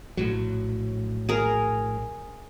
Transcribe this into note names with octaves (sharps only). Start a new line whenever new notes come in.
A#1 A2 F#3
G#4 A#4